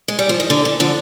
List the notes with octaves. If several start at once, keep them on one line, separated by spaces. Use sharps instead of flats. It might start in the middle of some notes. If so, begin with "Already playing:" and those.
G#3
G3
F3
D#3
D3
D3
D3 F3